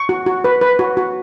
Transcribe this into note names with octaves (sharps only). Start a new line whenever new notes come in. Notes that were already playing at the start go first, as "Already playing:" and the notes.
Already playing: C#6
F#4
F#4
B4
B4
F#4
F#4